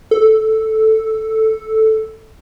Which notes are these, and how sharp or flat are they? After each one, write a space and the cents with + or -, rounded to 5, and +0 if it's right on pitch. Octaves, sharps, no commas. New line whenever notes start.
A4 +0